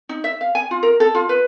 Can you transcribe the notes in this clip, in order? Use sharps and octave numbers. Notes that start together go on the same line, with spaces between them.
D#4
E5
F5
G#5
F4
A#4
A4
F4
B4